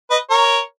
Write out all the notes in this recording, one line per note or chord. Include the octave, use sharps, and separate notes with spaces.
B4 D#5
A#4 C#5